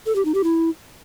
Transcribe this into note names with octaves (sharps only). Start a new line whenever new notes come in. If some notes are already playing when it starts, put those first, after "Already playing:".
A4
G4
D#4
G4
E4